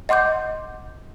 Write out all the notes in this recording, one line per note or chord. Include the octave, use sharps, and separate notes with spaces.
D#5 F#5 C6 D6 G6